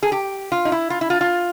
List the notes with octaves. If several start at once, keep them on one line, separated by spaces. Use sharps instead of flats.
G#4
G4
F4
D#4
E4
F4
E4
F4
F4